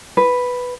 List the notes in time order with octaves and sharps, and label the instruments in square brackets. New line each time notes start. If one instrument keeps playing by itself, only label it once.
[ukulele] B4